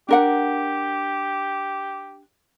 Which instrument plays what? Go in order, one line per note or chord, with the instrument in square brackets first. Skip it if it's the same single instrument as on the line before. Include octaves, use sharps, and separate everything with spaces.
[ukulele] D4 A#4 F#5 [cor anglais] G4